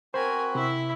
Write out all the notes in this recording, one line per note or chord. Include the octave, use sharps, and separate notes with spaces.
C4 F#4 A#4 C5 G#5 B5
C3 E4 E5